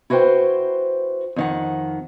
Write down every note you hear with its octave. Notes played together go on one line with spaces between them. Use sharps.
E4 F#4 B4 C5 G5
F2 D#3 F#5